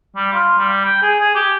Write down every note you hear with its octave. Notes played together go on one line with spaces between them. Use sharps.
G3
F4
G3
G5
G#4
G#4
G4